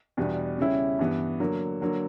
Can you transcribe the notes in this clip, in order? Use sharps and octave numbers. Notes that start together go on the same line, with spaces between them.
E2 B2 G3 B3 D4
C#3 G3 C#4 E4
G2 E3 B3
D3 F#3 A#3
D3 F#3 A#3